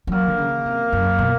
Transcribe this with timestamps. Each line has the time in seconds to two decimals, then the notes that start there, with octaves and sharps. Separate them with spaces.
0.07 F3
0.12 F#3 A#3 A#4
0.28 D3
0.38 C#3
0.66 C3
0.93 F#2
1.19 B2